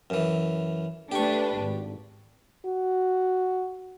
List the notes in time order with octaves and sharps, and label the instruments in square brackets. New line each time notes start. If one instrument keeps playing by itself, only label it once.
[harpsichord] F#2 E3
[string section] A3 D4 B4 [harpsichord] G4 C#6
[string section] G#1
[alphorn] F#4